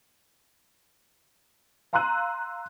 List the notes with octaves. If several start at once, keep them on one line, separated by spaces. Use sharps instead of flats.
F5 A#5 C6 E6 F#6 D#7